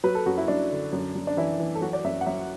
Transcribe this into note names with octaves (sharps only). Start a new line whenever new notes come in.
F#3 B4
A4
F#2 F#4
E4
F#2 D4
D3
F#2
F#2
D4
E3 E4
E3
A4
F#3 F#4
D5
F#2 E5
F#5
F#2 E5